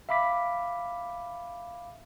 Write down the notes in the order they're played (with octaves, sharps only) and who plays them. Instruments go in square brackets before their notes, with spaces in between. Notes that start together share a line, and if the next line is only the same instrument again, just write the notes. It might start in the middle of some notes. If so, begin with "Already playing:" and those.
[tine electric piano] E5 F5 B5 D6 B6